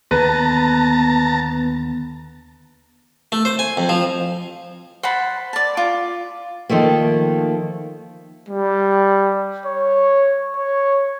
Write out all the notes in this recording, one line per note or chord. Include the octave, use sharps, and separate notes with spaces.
D#2 D3 B3 B4 A5 A#5
A3
C5
G#5
F2
F3
C5 F#5 A5 B5
D5 A5
F4 D6
D#3 F3 A3 A#3
G3
C#5
C#5